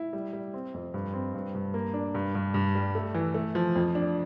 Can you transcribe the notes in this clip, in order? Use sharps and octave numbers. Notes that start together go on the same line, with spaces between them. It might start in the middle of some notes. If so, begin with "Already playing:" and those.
Already playing: E4
G3
G3
C4
F2
G2
C4
G2
G2
A#3
D4
G2
G2
G2
G3
A3
E3
A3
F3
F2
D4